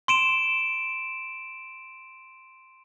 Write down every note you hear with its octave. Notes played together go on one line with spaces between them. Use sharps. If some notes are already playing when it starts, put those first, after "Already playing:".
C6 D7 E7